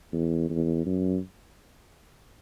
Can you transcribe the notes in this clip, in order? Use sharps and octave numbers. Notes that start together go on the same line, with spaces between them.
E2
E2
F#2